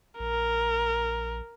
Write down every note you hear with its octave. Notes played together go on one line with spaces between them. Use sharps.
A#1 A#4